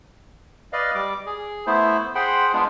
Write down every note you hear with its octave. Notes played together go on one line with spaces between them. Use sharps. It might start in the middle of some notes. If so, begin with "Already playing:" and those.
B4 D5 D#5 F5
G3 D6
G#4
A3 B3 E4 C5
G#4 C5 F#5 G5 B5 C6
G#3 B3 D4 F4